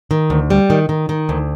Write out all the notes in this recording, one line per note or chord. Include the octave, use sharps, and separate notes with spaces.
D#3
D2
G3
D#3
D#3
D#3
D2